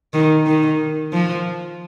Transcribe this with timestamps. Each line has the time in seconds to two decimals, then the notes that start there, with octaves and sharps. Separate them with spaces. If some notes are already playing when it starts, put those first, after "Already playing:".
0.13 D#3
0.47 D#3
1.13 F3